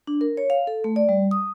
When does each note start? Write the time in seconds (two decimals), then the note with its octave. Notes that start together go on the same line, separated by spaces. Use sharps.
0.07 D4
0.21 A#4
0.37 C#5
0.50 F5
0.67 A4
0.84 A3
0.96 D5
1.09 G3
1.31 D#6